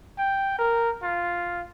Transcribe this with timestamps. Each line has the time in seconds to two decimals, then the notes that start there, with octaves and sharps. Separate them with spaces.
0.18 G5
0.59 A#4
1.03 F4